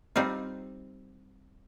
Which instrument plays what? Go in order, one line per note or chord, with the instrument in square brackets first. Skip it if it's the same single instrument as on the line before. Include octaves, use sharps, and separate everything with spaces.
[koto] G3 C4 D#4 F4